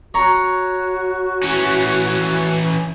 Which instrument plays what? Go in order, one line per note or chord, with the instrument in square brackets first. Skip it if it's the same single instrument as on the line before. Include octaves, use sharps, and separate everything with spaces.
[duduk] F#4 [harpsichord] C#5 A#5
[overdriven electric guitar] E3 C#4